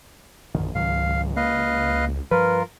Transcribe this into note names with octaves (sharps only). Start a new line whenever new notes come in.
A#1 F#2 D3 D#3
C#2 G#2 D#3 F#3 F5
A#3 B4 D#5 F5
G2 F3 F4 A#4 B4